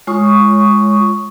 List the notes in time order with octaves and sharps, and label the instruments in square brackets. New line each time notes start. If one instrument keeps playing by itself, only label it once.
[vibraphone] G#3 F4 C#5 C#6 D#6